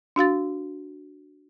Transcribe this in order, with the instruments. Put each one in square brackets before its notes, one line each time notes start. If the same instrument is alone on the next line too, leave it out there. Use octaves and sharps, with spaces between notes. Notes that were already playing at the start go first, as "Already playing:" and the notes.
[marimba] D4 F#4 F5 A6